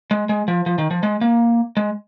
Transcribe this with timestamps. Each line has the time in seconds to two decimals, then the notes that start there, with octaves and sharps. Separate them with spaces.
0.11 G#3
0.29 G#3
0.48 F3
0.66 F3
0.78 D#3
0.91 F3
1.03 G#3
1.21 A#3
1.77 G#3